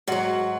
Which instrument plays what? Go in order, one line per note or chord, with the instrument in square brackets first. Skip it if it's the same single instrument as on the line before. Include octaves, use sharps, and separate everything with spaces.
[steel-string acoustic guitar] G#2 F#3 F#4